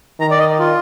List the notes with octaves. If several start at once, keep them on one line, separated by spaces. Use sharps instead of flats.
D#3 A#5
D5
D#5
F4